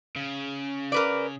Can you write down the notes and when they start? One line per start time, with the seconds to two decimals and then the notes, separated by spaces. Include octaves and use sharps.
0.16 C#3
0.92 A#4 B4 D5